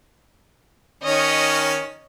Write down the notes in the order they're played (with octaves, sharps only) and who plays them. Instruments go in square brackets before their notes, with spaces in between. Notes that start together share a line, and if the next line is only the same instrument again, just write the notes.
[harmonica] D#3 C#4 [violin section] C#5 D#5